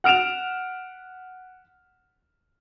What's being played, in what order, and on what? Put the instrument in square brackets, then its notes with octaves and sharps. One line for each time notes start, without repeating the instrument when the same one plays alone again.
[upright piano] F#5 F6 D7 E7 F7